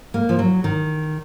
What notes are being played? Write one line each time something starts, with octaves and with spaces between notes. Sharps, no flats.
A#3
F3
F#3
D#3